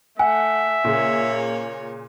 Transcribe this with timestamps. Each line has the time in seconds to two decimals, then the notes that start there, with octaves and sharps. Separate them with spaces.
0.19 A3 E5 F#5 G#5
0.85 A#2 C#3 A#3 G#4 C#5